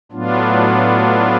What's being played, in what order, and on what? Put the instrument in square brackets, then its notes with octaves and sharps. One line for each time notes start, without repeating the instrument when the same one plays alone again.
[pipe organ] A2 F#3 B3 D4 F4